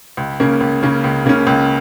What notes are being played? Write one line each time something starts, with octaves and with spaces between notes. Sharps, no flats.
C#2
C#3 A#3 C#4
C#2
C#3 A#3 C#4
C#2
C#3 A#3 C#4
C#2